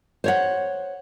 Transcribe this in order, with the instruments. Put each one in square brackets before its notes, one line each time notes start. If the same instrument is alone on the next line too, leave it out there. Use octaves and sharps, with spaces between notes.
[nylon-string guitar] C5 C#5 F#5